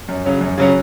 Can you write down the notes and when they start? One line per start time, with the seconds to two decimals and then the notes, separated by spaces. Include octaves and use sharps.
0.09 F#2
0.25 C#3 F#3 C#4
0.41 F#2
0.58 C#3 F#3 C#4